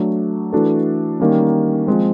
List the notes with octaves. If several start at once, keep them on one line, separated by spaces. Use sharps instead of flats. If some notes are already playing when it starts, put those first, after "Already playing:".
Already playing: F#3 A3 D4
E3 A3 D4 F#4 A4
D#3 G3 A#3 C#4
F3 G#3 C4